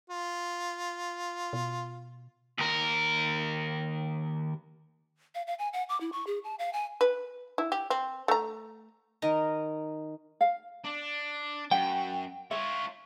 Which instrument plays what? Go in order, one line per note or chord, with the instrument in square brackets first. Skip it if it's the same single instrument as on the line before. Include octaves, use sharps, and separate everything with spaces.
[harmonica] F4
[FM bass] B2
[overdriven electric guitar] D#2 A#4
[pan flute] F5
F5
G#5
F#5
D6
E4
C#6
G#4
A5
F5
G#5
[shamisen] B4
E4
G4
C4
A3 A#5
[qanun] D#3 A#4 D#5 A#5
[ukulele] F5
[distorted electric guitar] D4
[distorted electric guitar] F#2 [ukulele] F#5 [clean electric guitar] G5
[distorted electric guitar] F4 C#5 [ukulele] E5